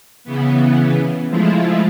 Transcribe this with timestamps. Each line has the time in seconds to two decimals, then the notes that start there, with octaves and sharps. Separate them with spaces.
0.24 C#3 E3 B3
1.29 F3 G#3 A3 E4 F4